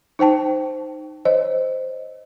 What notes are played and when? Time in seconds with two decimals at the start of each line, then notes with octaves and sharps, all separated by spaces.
0.19 D#4 C5 G5 A5
1.25 C5 C#5 D#5